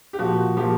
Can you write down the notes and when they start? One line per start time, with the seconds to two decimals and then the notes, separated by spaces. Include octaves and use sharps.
0.13 G4
0.19 A#2 F3 F#4
0.57 A#2 F3 G4